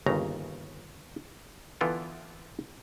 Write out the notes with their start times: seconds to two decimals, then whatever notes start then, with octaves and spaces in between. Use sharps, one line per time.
0.06 G1 D#2 C#3 A#5
1.81 D3 E3 B3 F4 A4 G5